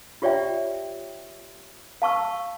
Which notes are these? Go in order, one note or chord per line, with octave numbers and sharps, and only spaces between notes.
F4 G4 C#5 D5 E5 G5
F5 A5 C#6 E6